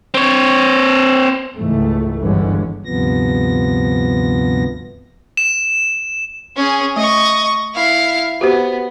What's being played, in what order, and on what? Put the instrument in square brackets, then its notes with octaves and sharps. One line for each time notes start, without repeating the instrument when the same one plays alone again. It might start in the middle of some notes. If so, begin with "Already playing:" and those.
[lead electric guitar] C4 C#5
[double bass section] C#2 G#2 E3 A3
G1 G2 D3 E3 G#3 C#4
[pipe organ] D2 G2 C3 F3 B3 A#6
[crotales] E7
[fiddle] C#4 G#4
[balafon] A3 [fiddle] D#5 C#6
[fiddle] E4 F5
[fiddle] B3 [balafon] F#4 G4 C5